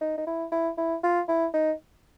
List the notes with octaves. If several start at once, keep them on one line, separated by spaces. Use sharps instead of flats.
D#4
D#4
E4
E4
E4
F4
E4
D#4